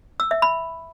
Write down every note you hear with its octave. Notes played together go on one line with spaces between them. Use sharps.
E6
E5
B5